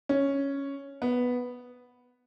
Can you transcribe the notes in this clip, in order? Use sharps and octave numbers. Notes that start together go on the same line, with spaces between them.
C#4
B3